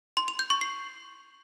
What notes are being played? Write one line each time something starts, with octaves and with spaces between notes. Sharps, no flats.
C6
F7
G6
C#6
C7